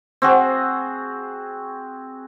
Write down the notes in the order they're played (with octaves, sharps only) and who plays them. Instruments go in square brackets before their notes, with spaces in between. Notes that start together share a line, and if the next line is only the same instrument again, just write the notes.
[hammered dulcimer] C4 F#4 G#4